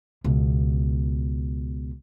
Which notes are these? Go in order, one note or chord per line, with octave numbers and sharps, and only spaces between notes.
C#2 B2